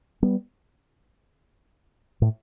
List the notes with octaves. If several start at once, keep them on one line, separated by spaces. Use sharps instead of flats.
G3 B3
A2